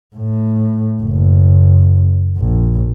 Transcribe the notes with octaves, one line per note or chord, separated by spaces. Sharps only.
A2
F#1
A#1